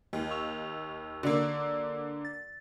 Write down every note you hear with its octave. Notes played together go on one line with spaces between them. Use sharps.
D#2
C#6 E6 F7
D3 A#3 F#4 D5 E6
A6